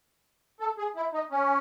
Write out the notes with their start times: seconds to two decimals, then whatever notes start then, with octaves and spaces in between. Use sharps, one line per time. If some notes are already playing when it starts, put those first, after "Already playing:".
0.60 A4
0.78 G#4
0.96 E4
1.14 D#4
1.31 C#4